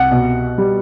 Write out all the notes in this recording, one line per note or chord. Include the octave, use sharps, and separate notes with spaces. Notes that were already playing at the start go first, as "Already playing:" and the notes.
Already playing: C2 F#5
B2
G3